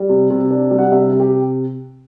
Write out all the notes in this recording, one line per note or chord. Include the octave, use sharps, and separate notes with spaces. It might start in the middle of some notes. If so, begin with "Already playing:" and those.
Already playing: G3 D5
C3
C3
D4
G3
F#5
C3 E5
C3
G4